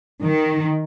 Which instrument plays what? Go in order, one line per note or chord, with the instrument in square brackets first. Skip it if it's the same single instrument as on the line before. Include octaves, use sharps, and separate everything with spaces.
[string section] D#3